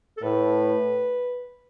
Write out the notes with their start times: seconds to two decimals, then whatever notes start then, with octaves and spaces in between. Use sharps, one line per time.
0.17 A4
0.23 A2 B4